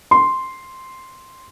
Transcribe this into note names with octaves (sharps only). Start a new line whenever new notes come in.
C6